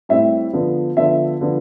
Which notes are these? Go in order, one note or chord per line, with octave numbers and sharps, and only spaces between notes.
A2 G3 C4 E4 E5
D3 F3 B3
D3 F3 B3 E5
D3 F3 B3